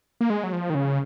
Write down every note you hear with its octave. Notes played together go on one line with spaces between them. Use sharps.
A#3
G#3
F#3
F3
D#3
C#3